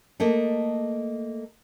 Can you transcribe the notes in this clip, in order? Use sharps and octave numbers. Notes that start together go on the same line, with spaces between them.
A3 A#3 A4 D#5